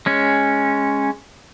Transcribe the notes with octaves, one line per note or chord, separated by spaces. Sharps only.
G#3 C#4